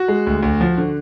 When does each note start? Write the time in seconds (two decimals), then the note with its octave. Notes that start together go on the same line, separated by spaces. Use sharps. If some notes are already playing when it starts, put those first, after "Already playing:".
Already playing: F#4
0.08 G#3
0.27 D2
0.43 D2
0.61 F3
0.78 D3